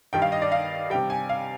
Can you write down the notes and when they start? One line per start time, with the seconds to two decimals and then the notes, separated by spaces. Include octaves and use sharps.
0.13 G2 D#3 G3 G5
0.22 F5
0.32 D#5
0.42 D5
0.52 F5
0.90 C3 G3 G5
1.10 G#5
1.29 F5